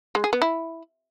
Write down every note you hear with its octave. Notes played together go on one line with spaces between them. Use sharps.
G#3
G#4
B3
E4